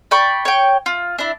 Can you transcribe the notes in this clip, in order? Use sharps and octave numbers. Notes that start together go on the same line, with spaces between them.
D5 G5 B5 C#6
C#5 G5
F4
D4 E4